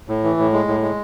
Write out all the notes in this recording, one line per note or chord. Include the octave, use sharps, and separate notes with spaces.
A2
E3
A2
G#3
A2
G#3